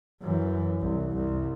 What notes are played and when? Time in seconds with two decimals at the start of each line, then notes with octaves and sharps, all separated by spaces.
0.21 F#2 E3
0.81 C2
1.15 C2